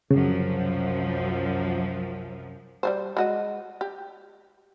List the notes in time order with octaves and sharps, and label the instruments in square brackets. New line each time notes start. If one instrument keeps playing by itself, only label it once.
[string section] C2 F#2 F3 [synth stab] C#3
[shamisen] G3 A3 C5
G#3 F#4 D#5
G4